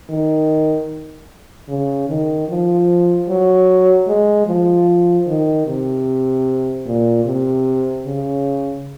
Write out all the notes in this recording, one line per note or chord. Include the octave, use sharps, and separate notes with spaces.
D#3
C#3
D#3
F3
F#3
G#3
F3
D#3
C3
A#2
C3
C#3